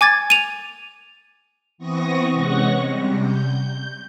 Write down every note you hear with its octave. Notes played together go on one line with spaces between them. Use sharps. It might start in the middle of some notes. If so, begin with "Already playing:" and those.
G#5 D6 G#6 A6
D#7 F7
E3 B3 C4 C#6 D#6 A#6
C3 G#3 C#4 F#5 C#6 A#6
C3 G3
G6